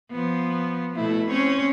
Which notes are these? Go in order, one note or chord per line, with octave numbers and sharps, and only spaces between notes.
F3 B3
B2 A3 E4
C4 C#4 C#5